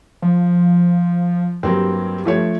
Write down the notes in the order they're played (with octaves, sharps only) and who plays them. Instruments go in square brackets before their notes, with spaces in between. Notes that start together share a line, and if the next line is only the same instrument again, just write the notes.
[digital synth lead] F3
[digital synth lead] G2 [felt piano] F#3 A#3 C4
[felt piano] F3 A3 C#5